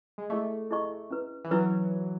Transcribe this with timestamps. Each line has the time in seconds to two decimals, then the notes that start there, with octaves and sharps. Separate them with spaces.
0.18 G#3
0.30 A3 E4 G#4 D#5 A5 C#6
0.70 E4 G#4 D#5 A5 C#6
1.10 C#4 E4 B4
1.44 E3
1.51 F#3 C#4 E4 B4